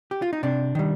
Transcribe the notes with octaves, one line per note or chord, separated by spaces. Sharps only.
G4
F4
D#4
C3 D4
D#3 G3